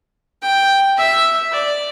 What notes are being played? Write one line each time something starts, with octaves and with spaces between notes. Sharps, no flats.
G5
E5
D5